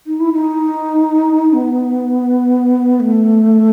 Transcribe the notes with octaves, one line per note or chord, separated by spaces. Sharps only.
D#4
E4
D#4
B3
A3